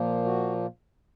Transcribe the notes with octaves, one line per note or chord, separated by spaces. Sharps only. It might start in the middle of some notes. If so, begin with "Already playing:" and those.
Already playing: A#2 F3 A#3
F#4